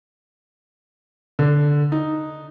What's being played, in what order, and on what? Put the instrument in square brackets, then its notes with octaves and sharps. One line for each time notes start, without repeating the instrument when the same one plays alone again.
[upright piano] D3
D#4